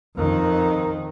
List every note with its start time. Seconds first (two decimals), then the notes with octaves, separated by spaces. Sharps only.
0.16 F2 D#3